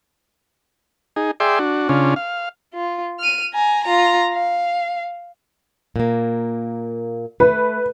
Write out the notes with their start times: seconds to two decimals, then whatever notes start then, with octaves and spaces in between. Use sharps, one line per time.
1.16 D#4 G#4
1.40 G#4 D5 E5 G5 C6
1.59 D4 F#4
1.89 C#3 C#4 D4 F4
2.16 F5
2.74 F4
3.20 F6 D#7
3.54 G#5 A#5
3.84 F4 A#5
4.34 F5
5.96 A#2 A#3
7.40 A3 B4